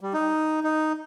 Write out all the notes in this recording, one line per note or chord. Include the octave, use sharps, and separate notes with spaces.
G3
D#4
D#4